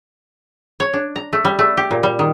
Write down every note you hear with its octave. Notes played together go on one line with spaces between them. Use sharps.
C#5
D4
A#5
A3
G3
A3
G4
A#2
G3
D#3